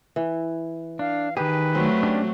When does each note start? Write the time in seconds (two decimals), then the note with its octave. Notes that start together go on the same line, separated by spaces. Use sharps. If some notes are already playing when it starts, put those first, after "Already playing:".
0.16 E3
0.99 D4 F5
1.37 D#3 G4 G#4 B4
1.75 F#3 A3 C4
2.03 C#4 D4 G4